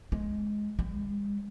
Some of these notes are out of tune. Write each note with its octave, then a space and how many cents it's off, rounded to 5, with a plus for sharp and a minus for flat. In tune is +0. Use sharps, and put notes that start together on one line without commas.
G#3 +5
G#3 -40